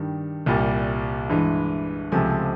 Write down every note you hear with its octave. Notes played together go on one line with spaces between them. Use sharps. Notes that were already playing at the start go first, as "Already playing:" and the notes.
Already playing: G2 D#3 G3
C2 A#2 G3
G2 E3 G#3
C#2 C3 F3 A3 G#5